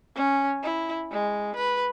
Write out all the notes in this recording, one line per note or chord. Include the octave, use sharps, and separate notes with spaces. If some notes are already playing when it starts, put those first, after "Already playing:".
C#4
E4
G#3
B4